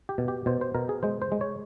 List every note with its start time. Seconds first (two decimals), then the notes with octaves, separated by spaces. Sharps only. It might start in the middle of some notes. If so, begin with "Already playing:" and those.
0.09 G4
0.18 B2
0.28 G4
0.46 B2 C5
0.61 C5
0.75 B2 A#4
0.89 G#4
1.03 G#3 C5
1.22 C5
1.32 G#3
1.41 C#5